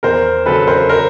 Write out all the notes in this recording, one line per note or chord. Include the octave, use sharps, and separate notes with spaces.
E2 A#4 C5
C#3 F#3 A4 B4
A#4 C5
A#4 C5